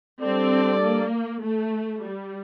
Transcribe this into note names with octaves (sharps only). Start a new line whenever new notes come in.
G3 C4 D4 A4 D5
A#3
A3
G3